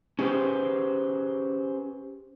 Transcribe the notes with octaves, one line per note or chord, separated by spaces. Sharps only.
C#4 G4 G#4 B4 C5